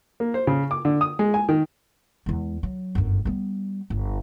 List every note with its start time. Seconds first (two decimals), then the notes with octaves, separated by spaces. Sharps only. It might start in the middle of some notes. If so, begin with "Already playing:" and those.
0.20 A#3
0.34 C5
0.47 C#3
0.71 D6
0.85 D3
1.01 D#6
1.19 G#3
1.34 G#5
1.49 D#3
2.26 E2 G#3
2.63 F#3
2.95 G1 F#2
3.25 G3 B3
3.90 G1